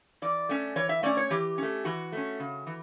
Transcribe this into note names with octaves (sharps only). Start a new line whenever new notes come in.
E3 D5
A3 C#4
E3 C#5
E5
A3 C#4 D5
C#5
E3 G4
A3 C#4
E3 F#4
A3 C#4
C#3
E3